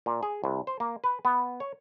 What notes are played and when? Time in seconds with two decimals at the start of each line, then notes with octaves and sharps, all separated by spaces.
0.06 A#2
0.23 G#4
0.44 C2
0.67 C5
0.80 A#3
1.04 B4
1.25 B3
1.60 C#5